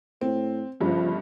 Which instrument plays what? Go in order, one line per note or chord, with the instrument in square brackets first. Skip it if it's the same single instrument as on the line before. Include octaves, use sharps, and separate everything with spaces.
[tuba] A2 [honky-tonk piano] C4
[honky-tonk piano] G1 G2 C#3 [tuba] F3